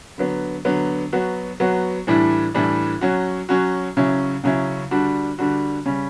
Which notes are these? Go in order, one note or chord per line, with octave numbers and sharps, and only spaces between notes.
D3 F#3 B3
D3 F#3 B3
F#3 B3 F#4
F#3 B3 F#4
A2 E3 G3 D4
A2 E3 G3 D4
F#3 C#4 F#4
F#3 C#4 F#4
C#3 F#3 C#4 E4
C#3 F#3 C#4 E4
D3 G3 D4 F#4
D3 G3 D4 F#4
C#3 G3 C#4